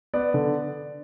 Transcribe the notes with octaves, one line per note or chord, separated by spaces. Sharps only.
B3 D5
D3